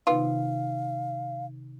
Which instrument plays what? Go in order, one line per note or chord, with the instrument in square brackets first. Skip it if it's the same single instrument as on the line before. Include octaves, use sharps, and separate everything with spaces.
[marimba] C3 D#3 D#4 [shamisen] B3 F4 [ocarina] F5